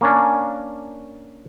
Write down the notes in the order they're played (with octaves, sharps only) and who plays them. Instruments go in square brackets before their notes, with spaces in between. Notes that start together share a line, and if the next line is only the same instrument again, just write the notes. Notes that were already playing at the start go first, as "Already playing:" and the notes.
[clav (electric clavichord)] A#3 C#4 D4